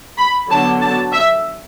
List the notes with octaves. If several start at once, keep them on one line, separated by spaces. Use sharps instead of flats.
B5
D3 F#3 B3 D4 A5
A5
E5